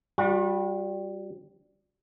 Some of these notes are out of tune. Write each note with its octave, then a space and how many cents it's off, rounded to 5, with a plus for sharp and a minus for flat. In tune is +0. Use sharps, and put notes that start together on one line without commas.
G3 +0 F#4 -45